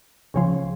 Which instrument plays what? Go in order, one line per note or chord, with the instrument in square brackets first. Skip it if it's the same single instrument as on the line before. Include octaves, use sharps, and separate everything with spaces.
[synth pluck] C#2 C#3 F3